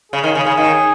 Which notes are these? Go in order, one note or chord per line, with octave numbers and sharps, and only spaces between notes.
C#3 G#4
D#3
C#3
C#3
D#3